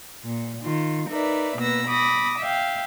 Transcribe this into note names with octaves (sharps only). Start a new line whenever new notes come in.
A#2
D#3 F4
D#4 A#4 B4 D5 E5
B2 A#3 B4 E6 A#6
B5 D6 D#6 A#6
E5 F5 G5